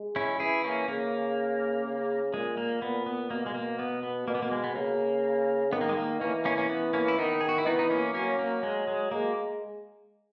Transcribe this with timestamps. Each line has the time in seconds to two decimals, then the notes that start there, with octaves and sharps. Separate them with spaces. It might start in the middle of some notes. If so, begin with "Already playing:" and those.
Already playing: G#3
0.16 C#4 E4
0.39 E3 E4 G#4
0.64 A#3 C#4
0.88 C#3 A#3
1.85 C#3
2.33 A#2 G#3
2.57 A#3
2.82 A#2 B3
3.06 B3
3.30 B2 A#3
3.46 G#3
3.55 A#3
3.79 B3
4.03 B3
4.27 B2 A#3
4.35 B3
4.42 A#3
4.51 G#3
4.64 B3
4.76 C#3 A#3
5.72 D#3 B3
5.81 A#3
5.89 G#3
5.97 A#3
6.21 E3 A#3 C#4
6.45 A#3 C#4
6.57 A#3 C#4
6.70 B3
6.93 A#3 C#4
7.08 E4
7.18 D#3 B3 D#4
7.41 G#4
7.49 F#4
7.58 E4
7.66 E3 B3 D#4
7.79 D#4
7.90 A#3 C#4
8.14 F#3 A#3 C#4
8.39 A#3
8.63 G#3
8.88 G#3
9.11 G#3 A#3